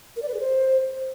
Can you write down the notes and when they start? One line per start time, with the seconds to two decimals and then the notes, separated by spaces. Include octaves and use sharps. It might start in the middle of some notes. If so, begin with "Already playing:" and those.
0.16 A#4
0.22 D5
0.28 B4
0.34 G#4
0.40 C5